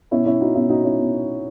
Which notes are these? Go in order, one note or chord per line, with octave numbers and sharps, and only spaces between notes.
B2 C#4 E4
C#4 E4
D#4 F#4
B2 C#4 E4
D#4 F#4
C#4 E4
B2